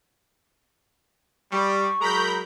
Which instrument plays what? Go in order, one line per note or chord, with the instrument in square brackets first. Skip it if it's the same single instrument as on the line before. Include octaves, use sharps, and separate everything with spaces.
[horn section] G3 [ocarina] C#6
[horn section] F#3 G#3 A#4 [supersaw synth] A#5 B5 G6